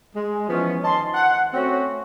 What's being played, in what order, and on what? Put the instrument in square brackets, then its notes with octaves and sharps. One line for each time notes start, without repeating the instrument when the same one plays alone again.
[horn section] G#3
E3 F3 B3 C#4
D#3 D#5 A5 C6
F#5
A3 C4 C#4 F#4